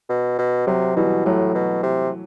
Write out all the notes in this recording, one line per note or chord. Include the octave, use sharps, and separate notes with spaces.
B2
B2
C3 F#3
B2 E3 G3
A2 F#3 A3
B2
C3